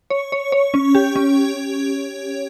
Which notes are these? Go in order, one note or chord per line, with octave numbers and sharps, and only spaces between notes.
C#5
C#5
C#5
C#4
G4
C#4